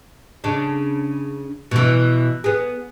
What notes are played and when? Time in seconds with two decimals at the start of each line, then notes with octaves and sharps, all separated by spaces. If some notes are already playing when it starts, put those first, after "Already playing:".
0.44 C#3 D4
1.71 B2 E3
2.44 B3 G#4